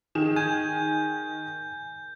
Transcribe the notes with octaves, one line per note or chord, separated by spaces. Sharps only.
D#3 G#4 E7
G#5 G6